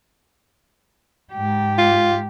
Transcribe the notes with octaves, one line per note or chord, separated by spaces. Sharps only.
G#2 G4
F4